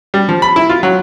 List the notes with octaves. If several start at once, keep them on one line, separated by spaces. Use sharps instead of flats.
G3
F3
B5
E4
F4
F#3